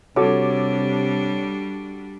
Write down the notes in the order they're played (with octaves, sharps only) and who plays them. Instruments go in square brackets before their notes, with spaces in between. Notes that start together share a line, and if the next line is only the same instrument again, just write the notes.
[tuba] C3 [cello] G3 D4 [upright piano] F#4 A4 D6 [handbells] C#5